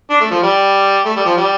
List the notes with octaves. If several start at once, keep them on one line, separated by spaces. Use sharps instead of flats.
D4
A3
F3
G3
A3
G3
F3
G3